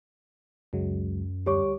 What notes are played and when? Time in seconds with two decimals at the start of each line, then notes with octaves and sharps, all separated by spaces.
0.73 C#2 F#2 F#3 G#3
1.46 D2 G3 G4 C#5 C#6 D6